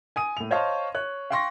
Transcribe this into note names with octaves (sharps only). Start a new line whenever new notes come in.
G#5 D#6 D#7
A2 F7
C5 C#5 D#5 F5 A5 C6
C#5 F#6
F5 G5 C6 C#6 A#6